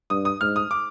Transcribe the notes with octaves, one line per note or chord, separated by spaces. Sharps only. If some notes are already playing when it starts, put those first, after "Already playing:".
G2 D#6
D#6
G#2 F6
D#6
D6